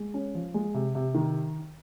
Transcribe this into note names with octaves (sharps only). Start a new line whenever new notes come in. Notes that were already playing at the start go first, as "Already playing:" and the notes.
Already playing: G#3
C#4
F3
G#3
C3
C3
D#3